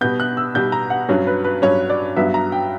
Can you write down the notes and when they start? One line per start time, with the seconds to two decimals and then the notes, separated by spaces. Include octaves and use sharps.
0.01 B2 G3 B3 G6
0.20 F#6
0.37 E6
0.55 B2 G3 B3 G6
0.72 A#5
0.90 F#5
1.09 G2 F#3 C#4 C#5
1.27 B4
1.44 B4
1.62 G2 F#3 C#4 C#5
1.90 D5
2.16 G2 F#3 B3 E5
2.34 A#5
2.52 G5